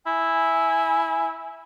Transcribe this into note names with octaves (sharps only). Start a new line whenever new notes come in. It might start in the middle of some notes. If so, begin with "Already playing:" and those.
E4 G#5